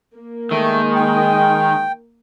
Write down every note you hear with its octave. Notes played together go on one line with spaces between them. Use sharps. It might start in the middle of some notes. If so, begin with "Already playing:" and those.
A#3
D#3 G#3 A3
G5